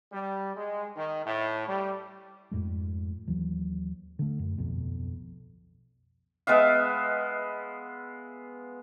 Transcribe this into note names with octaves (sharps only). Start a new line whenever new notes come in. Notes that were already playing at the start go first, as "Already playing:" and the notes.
G3
G#3
D#3
A2
G3
F2 G#2 G#3 A3
D#2 E3 F#3
D3 A3
F#2
D1 B1 F2 B2
G#3 B3 E5 F5